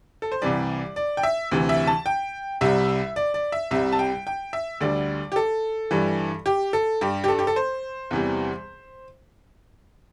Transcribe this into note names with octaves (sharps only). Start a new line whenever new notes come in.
A4
C5
C2 C3 E3 G3 D5
D5
G5
E5
D2 C3 E3
E5
A5
G5
C2 C3 G3 E5
D5
D5
E5
C2 C3 G3 E5
A5
G5
G5
E5
D2 D3 G3 D5
G4
A4
G2 E3 G3
G4
A4
G2 G3 G4
G4
A4
G4
A4
C5
E2 C3 E3 G3